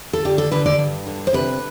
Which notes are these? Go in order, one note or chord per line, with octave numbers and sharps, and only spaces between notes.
A4
D3 G4
A4
D3 B4
D5
G2
D3
C5
C3 B4